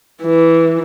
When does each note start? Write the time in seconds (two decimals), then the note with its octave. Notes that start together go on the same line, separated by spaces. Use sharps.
0.22 E3